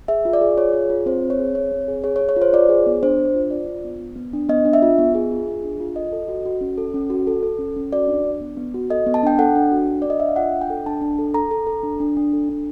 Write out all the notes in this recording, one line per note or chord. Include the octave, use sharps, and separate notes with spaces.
G#4 E5
F4
D5
G#4
F4 C#5
G#4
F4
C4 C5
C4
C#5
G#4
C4 C#5
C4
G#4
G#4 C#5
C#5
G#4
C#5
F4
C5
F4 D5
G#4
B3
D4 C5
D4
F4
F4 D5
F4
B3
B3
B3
D4
B3 D#5
D4
E5
F4
B3
G#4
F4
G#4
D4
F4
A4 D#5
A4
F#4
F#4
C#4
A4
C#4
F#4
A4
A4
C#4
C#4
F#4 D5
D4
D4
B3
B3
F#4
A4 D#5
B3
A5
D4 G5
A4 F#5
D4
F#4
D4
D4 D5
D#5
D4 E5
F5
F4 F#5
D4
G5
A4
D4 A5
D4
A4
A4 A#5
A4
A4
D4
D4
D4
A4
D4